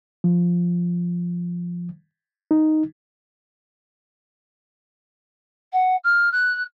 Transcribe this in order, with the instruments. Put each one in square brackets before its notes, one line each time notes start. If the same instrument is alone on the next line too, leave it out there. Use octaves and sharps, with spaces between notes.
[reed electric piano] F3
D#4
[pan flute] F#5
F6
F#6